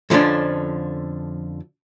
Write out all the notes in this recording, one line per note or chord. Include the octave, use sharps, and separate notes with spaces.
F2 D3 F3 C#4 D4